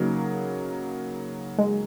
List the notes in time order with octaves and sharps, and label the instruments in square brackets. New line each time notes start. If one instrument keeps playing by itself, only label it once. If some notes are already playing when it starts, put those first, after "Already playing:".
Already playing: [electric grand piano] C#3 F#3 A#3 D#4 A#4
[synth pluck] G#3